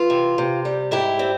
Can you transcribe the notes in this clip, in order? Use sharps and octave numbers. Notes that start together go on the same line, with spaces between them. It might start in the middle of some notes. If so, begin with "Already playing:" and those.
Already playing: E3 F4
C3
C3
G3
G#2 E4 G4
C4